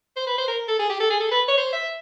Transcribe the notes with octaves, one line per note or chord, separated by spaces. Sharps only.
C5
B4
C5
A#4
A4
G#4
G4
A4
G#4
A4
B4
C#5
C5
E5